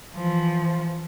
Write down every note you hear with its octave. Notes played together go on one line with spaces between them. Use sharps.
E3 F3